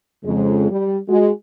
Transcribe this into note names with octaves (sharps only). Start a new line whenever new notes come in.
F2 C#3 G#3
G3
G#3 F#4